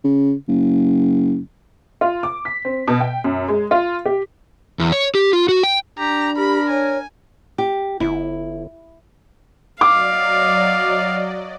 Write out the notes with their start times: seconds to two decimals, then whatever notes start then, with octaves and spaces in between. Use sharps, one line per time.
0.04 C#3
0.48 F#1
2.01 F4
2.23 D6
2.45 B6
2.65 C4
2.88 B2
3.01 G5
3.24 F#2
3.48 G#3
3.71 F4
4.05 G4
4.79 E2
4.92 C#5
5.15 G4
5.33 F4
5.49 F#4
5.63 G5
5.99 D4 G4 A#5
6.37 G4 A#4 B5
6.70 C#5 G#5
7.58 G4
8.00 G1 E4
9.81 F#3 D5 D#5 F5 D6